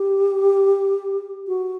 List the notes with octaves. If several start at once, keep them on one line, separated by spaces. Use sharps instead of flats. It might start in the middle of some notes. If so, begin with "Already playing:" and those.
Already playing: G4
F#4